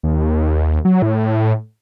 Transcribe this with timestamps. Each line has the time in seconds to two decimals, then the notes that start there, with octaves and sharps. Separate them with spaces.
0.03 D#2
0.85 F#3
1.02 A2